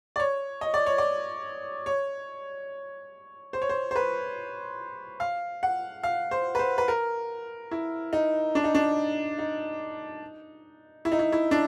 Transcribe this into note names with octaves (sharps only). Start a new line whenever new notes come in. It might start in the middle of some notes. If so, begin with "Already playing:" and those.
D5
C#5
D#5
D5
C#5
D5
C#5
C5
C#5
C5
C5
B4
F5
F#5
F5
C5
B4
C5
B4
A#4
E4
D#4
D4
D#4
D4
D#4
E4
D#4
E4
E4
D4